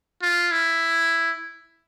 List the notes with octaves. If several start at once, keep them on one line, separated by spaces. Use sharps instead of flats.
F4
E4